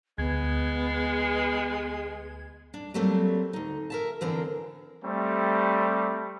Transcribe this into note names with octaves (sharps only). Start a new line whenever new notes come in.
D2 G#3 B3 G#6
D4
F#3 G3 A3 A#3 C4
D2 D#4
A#4 E5 A5
D3 E3 B3 C4 D4 A#4
G3 A3 C4